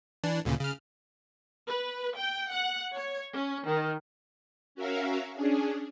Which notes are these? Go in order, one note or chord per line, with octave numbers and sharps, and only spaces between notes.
E3 D4
D2 A#2 C#3
C#3 F6
B4
G5
F#5
C#5
C#4
D#3
C#4 F#4 A#4 E5 F5
C#4 D4 G#4